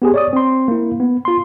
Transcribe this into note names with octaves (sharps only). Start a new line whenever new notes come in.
B3 G4 G#4
C#5 D5 D#6
C4 C6
A#3 E4
B3
F4 C6